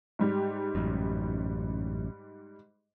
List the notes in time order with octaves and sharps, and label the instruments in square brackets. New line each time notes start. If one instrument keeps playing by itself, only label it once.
[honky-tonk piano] G#2 G3 G4
[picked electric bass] A1 F#2